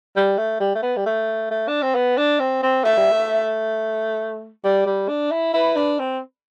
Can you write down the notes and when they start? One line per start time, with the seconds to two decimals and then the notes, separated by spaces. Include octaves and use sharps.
0.16 G3
0.38 A3
0.60 G3
0.75 A3
0.82 B3
0.97 G3
1.06 A3
1.50 A3
1.68 D4
1.82 C4
1.95 B3
2.17 D4
2.39 C4
2.63 C4
2.84 A3 E5
2.97 G3
3.11 A3
4.64 G3 D5
4.86 G3
5.08 D4
5.31 E4
5.54 E4 B4
5.76 D4
5.99 C4